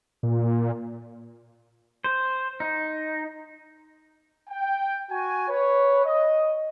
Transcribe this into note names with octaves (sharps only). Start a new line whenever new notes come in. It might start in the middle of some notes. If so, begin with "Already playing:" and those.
A#2
C5
D#4
G5
F#4 G#5
B4 C#5
D#5